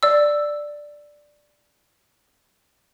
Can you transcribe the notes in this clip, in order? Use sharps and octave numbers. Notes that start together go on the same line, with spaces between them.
D5 E6